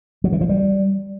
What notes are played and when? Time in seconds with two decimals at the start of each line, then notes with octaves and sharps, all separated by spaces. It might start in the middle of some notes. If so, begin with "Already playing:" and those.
0.24 F#3
0.32 E3
0.41 F3
0.49 G3